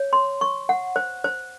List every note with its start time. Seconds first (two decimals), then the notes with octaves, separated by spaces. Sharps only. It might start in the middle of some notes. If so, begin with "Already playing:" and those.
Already playing: C#5
0.13 C6
0.41 C#6
0.69 F#5
0.96 C5
1.24 C5